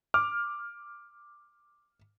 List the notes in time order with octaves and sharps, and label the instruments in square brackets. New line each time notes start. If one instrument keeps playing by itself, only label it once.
[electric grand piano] D6 F6